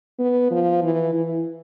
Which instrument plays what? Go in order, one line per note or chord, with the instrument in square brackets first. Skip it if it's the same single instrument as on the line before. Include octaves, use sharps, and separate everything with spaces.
[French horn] B3
F3
E3
E3